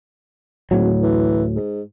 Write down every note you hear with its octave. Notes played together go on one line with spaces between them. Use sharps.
G#1 D2 A2 F#3
E3
G#2